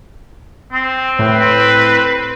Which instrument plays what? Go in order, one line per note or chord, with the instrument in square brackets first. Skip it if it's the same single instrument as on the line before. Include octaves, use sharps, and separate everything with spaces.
[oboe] C4
[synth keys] A2 [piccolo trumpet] B4